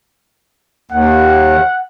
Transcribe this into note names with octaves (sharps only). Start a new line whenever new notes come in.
D#2 F#5